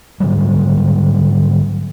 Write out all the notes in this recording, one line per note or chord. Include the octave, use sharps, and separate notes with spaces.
G#2 D3 F#3 G3